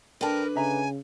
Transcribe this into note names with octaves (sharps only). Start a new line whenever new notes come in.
D3 A#4 B4 D5 G5 A5
C#3 D#5 E5 G#5 A#5